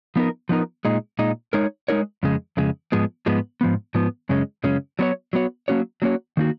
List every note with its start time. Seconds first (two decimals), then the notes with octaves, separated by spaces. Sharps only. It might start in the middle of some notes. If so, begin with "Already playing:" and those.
0.16 F3 B3 D#4 A#4
0.49 F3 B3 D#4 A#4
0.85 A#2 G#3 D#4
1.19 A#2 G#3 D#4
1.53 G#3 D#4 A#4 C#5
1.88 G#3 D#4 A#4 C#5
2.23 F2 C#3 G#3
2.57 F2 C#3 G#3
2.92 G#2 F3 G#3 B3
3.26 G#2 F3 G#3 B3
3.61 G#2 F3 B3
3.95 G#2 F3 B3
4.29 F#2 C#3 G#3 C#4
4.64 F#2 C#3 G#3 C#4
4.99 F#3 B3 F#4 C#5
5.33 F#3 B3 F#4 C#5
5.68 F#3 A#3 C#4 F#4 C#5
6.02 F#3 A#3 C#4 F#4 C#5
6.37 D#3 A#3 D#4 F#4